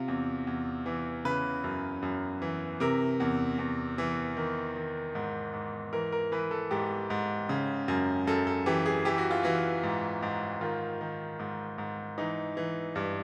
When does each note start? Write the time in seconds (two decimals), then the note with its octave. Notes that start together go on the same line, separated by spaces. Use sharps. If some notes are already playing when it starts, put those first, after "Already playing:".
Already playing: C3 F4
0.08 E2
0.47 E2
0.86 E3
1.25 C#3 B4
1.64 F#2
2.02 F#2
2.42 E3
2.80 C3 A#4
3.20 E2
3.59 E2
3.98 E3
4.37 D#3
4.76 D#3
5.15 G#2
5.54 G#2
5.93 E3 A#4
6.12 A#4
6.32 E3 B4
6.51 A4
6.71 G#2 G4
7.10 G#2
7.49 C#3
7.88 F#2
8.27 F#2 A4
8.47 A4
8.66 E3 G4
8.86 G#4
9.05 E3 G4
9.18 F#4
9.31 F4
9.43 E3 F#4
9.83 G#2
10.22 G#2
10.61 D#3 F4
11.01 D#3
11.39 G#2
11.78 G#2
12.18 E3 D#4
12.57 E3
12.95 G2